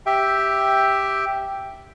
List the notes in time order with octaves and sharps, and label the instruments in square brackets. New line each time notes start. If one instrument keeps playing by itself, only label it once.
[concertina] G4 E5 G5